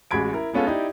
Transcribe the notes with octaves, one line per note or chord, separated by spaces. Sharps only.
A1 G#3 F#4 B5 G#6 D7
E4 A#4
G#3 B3 C#4 F4 A4
D#4 E4 G4 D5